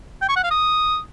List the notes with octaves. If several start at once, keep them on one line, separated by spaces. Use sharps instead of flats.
G5
C#6
F#5
F5
D#6